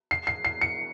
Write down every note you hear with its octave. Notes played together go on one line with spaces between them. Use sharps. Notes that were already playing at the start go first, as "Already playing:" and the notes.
C7
C7
C7
C#7